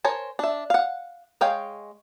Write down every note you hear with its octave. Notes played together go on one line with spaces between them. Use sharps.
A#4 C5 C#5 G#5 A5
D4 E5
F5 F#5
G#3 C#5 F5 G5